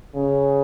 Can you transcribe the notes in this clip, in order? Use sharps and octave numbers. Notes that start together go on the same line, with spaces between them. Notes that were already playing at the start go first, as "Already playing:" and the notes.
C#3